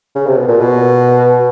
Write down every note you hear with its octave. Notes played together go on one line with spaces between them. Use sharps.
C#3
C3
B2
A#2
B2